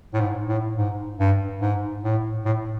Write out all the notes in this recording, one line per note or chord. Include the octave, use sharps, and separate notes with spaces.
A2
G#2
A2
G#2
G2
G#2
A2
A2